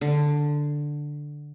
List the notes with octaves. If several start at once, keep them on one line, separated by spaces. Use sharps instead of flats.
D3